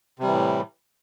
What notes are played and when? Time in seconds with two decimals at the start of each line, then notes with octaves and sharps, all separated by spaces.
0.19 C3
0.23 G3
0.27 E3
0.31 A2